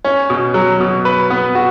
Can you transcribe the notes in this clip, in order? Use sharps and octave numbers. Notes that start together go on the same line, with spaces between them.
C#4
B2
F#3
B2
B4
B3
F#4